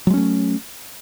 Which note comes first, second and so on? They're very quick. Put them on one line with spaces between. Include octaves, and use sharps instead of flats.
F#3 G#3 C#4 A3